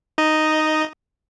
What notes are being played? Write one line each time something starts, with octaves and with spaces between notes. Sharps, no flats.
D#4 D#5